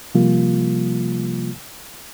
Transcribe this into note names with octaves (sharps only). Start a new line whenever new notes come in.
C3 F3 G3 A#3 F4